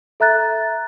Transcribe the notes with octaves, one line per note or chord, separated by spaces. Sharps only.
A4 E5 A#5 F#6 A6